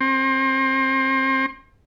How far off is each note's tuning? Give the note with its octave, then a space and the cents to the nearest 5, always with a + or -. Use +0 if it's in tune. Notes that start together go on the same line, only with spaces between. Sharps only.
C4 +30